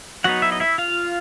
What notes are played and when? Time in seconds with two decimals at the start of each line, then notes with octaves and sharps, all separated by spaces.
0.24 F#3 B3 D#4 F#4 F#5
0.42 E4 E5
0.52 D#5
0.60 E4 E5
0.78 F4 F5